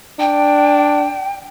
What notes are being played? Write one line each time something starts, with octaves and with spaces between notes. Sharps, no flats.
D4 G5